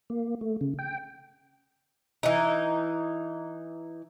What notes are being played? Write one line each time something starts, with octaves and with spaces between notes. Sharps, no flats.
A#3
A3
C#3
G5
E3 D#4